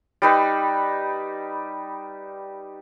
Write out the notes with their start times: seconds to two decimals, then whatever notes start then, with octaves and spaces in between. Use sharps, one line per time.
0.22 G3 D#4 B4